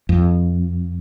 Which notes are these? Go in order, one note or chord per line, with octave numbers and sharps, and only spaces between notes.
F2